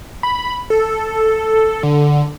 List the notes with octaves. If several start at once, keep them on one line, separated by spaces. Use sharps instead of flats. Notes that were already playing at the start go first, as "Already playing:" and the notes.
B5
A4
D3